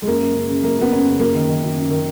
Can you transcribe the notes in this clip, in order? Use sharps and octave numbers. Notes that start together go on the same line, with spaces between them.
G#3
F#2 A#3
F#2
C#3
C#3
F#2 A#3
F#2 B3
F#2 C#4
C#3
F#2 A#3
D#3
D#3
F#2
F#2
D#3